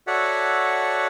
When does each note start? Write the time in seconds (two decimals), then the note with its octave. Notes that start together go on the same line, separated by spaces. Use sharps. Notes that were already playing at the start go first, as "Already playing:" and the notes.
0.07 F#4 A4 C#5 D5 E5 F#5